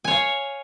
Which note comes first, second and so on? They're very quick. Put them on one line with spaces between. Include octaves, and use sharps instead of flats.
G#5 C#5 F5